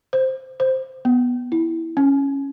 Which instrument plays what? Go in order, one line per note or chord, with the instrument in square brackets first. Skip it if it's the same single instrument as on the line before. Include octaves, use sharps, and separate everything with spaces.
[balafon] C5
C5
B3
E4
C#4